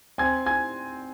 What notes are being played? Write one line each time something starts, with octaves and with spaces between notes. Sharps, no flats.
C4 G#5 G#6
G#5 G#6